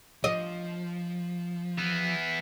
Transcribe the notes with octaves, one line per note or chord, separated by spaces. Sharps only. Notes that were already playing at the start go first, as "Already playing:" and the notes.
F3 D#5
E3 B3